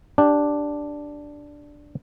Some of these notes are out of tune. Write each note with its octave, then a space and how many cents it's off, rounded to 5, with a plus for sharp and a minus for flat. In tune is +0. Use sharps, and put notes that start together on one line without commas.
D4 +0 G4 +0